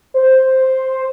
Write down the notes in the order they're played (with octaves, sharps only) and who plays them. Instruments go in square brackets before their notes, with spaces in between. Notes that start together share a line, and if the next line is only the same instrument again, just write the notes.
[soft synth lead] C5